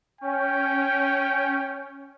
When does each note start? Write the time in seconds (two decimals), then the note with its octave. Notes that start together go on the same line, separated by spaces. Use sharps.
0.21 C#4 G5